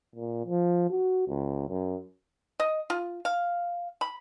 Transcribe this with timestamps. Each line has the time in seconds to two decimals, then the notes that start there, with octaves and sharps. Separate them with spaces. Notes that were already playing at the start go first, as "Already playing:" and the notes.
0.16 A#2
0.46 F3
0.91 F#4
1.29 C#2
1.69 F#2
2.60 D#5
2.90 F4
3.25 F5
4.01 B5